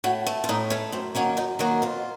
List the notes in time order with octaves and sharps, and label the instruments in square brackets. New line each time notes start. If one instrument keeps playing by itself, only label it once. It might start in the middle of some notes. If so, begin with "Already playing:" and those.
[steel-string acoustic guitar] A2 F#4
A3
F4
A2 D#4
A3 C#4
F#2 C4
D#3 F#3 A#3 C#4
F#2 D#4
D#3 F#3 A#3 F#4
F2 F4